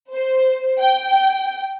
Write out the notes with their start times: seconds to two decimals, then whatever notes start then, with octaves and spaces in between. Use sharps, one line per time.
0.12 C5
0.79 G5